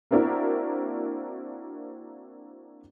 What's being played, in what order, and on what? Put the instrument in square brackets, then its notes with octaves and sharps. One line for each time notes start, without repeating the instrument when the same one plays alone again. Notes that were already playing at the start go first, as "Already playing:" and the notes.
[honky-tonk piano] A#3 C4 D4 E4 F#4 A#4